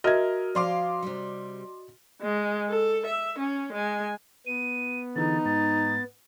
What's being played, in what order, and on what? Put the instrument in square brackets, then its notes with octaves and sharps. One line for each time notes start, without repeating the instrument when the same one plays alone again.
[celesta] F#4 [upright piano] A#4 E5 F6 [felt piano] D#5 G#6
[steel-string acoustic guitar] F3 F5 [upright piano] D5 C6 D6
[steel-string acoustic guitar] C3 G3
[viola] G#3
A4
E5
C#4
G#3 G#5
[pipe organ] B3 [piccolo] D#7
[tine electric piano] D3 E3 G#4 [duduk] D#4 [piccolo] A6
[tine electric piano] G#2 [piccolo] A6